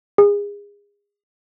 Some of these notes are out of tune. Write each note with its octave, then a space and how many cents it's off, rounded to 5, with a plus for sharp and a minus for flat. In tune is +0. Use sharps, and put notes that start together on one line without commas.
G#4 -30